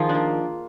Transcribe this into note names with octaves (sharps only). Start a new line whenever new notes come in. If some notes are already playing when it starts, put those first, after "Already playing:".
Already playing: D#3 F3 F4 G#4 C5
D4
A#3